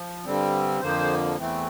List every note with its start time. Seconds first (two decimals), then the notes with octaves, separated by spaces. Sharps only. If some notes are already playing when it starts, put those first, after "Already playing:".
Already playing: F3
0.25 G2 D3 G3 C4
0.81 F2 D3 F3 A#3 C5
1.38 E2 E3 A3 C4